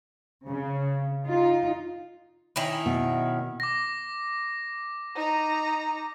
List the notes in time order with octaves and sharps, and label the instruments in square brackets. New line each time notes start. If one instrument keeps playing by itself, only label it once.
[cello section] C#3
D#4 F4
[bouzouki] D#3 C#4 E4
[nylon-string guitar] B2
[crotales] D6 A#6
[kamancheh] D#4 A#5